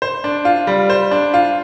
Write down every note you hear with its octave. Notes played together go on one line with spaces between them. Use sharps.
C5
D4
F4
G3
C5
D4
F4